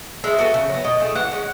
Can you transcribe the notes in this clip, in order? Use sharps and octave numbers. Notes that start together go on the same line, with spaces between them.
G#3 E5
B3 F#4 A4
C#3
F#3 B3
B2 D#5
A3 E4 G#4
E3 F#5
G#3 C#4